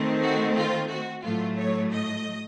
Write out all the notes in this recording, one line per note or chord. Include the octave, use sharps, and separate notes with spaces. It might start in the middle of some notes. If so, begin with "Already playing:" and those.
Already playing: D#3 A3 C4
F#4
F4
F#4
A2 F#3 A3 F4
C#5
D#5